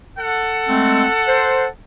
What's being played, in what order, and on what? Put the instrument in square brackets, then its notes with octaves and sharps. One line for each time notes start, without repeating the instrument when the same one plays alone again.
[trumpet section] A4 F#5
[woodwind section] G#3 A3 C4
C5